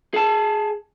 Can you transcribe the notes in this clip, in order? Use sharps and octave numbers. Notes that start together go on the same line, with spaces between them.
G#4 A5